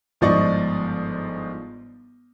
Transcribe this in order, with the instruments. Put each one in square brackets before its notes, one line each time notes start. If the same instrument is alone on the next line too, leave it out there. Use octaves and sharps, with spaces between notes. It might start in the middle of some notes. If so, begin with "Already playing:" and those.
[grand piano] G1 G#2 F3 D5 D#5 C#6